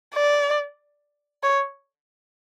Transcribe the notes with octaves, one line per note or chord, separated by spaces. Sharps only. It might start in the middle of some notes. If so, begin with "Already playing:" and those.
D5
C#5